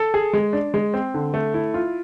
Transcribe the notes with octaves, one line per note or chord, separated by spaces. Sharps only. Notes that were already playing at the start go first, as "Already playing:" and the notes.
Already playing: A4
G#4
G#3
D4
G#3
C4
D3
A3
E4
F4